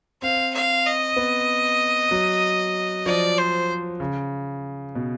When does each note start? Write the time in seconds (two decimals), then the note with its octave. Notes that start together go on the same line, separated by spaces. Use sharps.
0.22 C4 F5
0.54 F5
0.86 D#5
1.16 B3
2.11 F#3
3.06 F3 D5
3.38 C5
4.00 C#3
4.95 B2